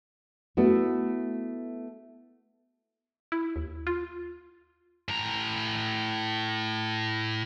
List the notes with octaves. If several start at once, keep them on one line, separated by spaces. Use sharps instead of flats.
A3 B3 E4 F#4
E4
D#2
F4
A2 A#5